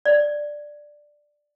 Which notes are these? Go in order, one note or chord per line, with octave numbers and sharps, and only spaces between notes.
D5